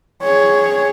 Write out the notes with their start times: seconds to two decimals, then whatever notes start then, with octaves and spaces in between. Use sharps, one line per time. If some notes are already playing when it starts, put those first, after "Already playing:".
0.22 G#4 C#5